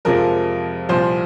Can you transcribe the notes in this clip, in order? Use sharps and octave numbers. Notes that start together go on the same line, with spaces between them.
F2 C3 F3 G#3 A#4
C2 A#2 F3 C5